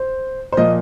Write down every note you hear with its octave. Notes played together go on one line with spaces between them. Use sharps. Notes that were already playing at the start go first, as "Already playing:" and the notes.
Already playing: C5
C5
A#2 F3 A#3 D#5